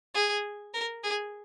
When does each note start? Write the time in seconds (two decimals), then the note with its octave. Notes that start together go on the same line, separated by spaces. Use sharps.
0.14 G#4
0.74 A#4
1.03 G#4